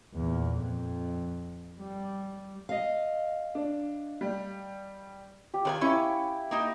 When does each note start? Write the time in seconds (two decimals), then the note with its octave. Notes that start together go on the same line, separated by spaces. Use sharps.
0.15 E2 A#2
0.60 F2
1.80 G3
2.69 D#5 F5
3.55 D4
4.21 G3
5.54 G4
5.65 D#3 B4 F5 G5 G#5
5.81 C#4 E4 D6
6.51 A#3 D#4 G4